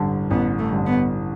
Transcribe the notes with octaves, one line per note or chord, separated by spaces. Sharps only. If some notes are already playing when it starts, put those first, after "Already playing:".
Already playing: A1 G2 D3
A1 B3
A3
G2 D3
B3